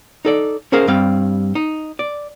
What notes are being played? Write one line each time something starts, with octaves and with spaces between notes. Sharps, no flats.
D#4 A4 D5
C#4 G#4 A#4 C5 F5
G2 G3 C4 F5
D#4
D5